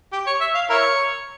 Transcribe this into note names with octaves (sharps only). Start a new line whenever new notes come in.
G4
C#5
E5
F5
E4 A#4 C#5